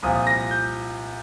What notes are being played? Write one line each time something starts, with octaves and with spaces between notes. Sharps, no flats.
C2 A#2 F3 D#6
A#6
G6